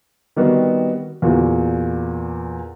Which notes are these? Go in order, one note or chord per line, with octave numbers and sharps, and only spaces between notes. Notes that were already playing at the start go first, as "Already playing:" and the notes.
D#3 G3 B3 C4 F#4
E2 A#2 F#4